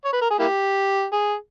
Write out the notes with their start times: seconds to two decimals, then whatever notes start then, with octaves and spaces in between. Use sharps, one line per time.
0.05 C#5
0.13 B4
0.21 A#4
0.30 G#4
0.39 A#3 E4 G4
1.12 G#4